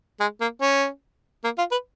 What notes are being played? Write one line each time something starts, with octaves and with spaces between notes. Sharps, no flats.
G#3
A#3
C#4
A#3
F4
B4